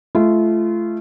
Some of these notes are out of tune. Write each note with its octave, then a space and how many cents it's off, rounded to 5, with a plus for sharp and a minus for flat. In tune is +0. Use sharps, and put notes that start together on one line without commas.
A3 -30 F4 -30